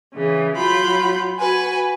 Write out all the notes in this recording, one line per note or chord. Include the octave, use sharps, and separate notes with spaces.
C#3 E3
F#3 F4 B5 G6
F#4 B4 G#5